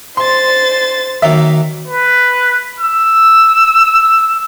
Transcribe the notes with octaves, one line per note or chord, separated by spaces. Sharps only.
C5 C6 A6
D#3 F#3 A#3 E5
B4
E6